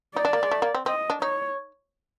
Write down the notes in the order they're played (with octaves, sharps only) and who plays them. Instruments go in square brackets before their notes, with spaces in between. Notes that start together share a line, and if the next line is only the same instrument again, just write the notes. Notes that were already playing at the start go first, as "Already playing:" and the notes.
[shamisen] D#4 [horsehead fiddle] D5
[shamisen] D4
A#3
G#3
A3
A#3
C4
[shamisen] C4 [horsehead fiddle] D#5
[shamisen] D4
[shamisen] D#4 [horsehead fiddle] C#5